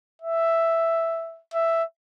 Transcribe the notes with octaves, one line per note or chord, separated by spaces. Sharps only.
E5
E5